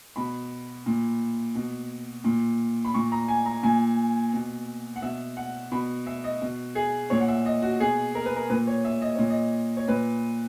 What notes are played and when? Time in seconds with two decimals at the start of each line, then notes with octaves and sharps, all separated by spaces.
0.16 B2 B5
0.86 A#2
1.55 B2
2.24 A#2
2.85 B5
2.94 A#2 C#6
3.12 A#5
3.28 G#5
3.46 A#5
3.63 A#2 G#5
4.33 B2
4.96 F#5
5.02 B2 E5
5.37 F#5
5.72 B2 B5
6.06 E5
6.24 D#5
6.42 B2
6.75 G#4
7.10 A#2 C#5
7.20 F#5
7.28 E5
7.46 D#5
7.62 F#4
7.80 B2 G#4
8.15 A#4
8.26 B4
8.36 A#4
8.50 A#2 B4
8.67 C#5
8.85 E5
9.02 D#5
9.15 A#2 C#5
9.30 D#5
9.77 C#5
9.88 A#2 B4